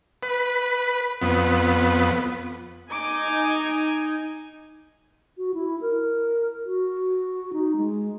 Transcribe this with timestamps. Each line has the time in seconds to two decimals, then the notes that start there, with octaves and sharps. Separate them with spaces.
0.23 B4
1.22 F2 B3
2.91 D#4 G#5 D6
5.38 F#4
5.54 E4
5.81 A#4
6.65 F#4
7.53 D#4
7.76 G#3